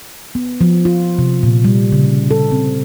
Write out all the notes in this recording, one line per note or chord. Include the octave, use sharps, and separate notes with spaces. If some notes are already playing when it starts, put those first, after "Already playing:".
B3
F3
F4
C3
A#2
G3
C#3
A4
C4